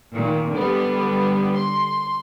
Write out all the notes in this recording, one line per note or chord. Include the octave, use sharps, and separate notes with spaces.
A#2 D#3
D3 G3 B3
C6